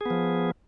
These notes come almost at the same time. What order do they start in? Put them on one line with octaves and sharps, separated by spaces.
G#4 B3 F3